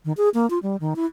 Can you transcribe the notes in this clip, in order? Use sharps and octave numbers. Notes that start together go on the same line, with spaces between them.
D#3
G#4
A#3
F4
G3
D#3
E4